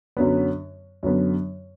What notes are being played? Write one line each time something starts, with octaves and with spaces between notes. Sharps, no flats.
F#2 D3 F#3 B3
F#2 D3 F#3 B3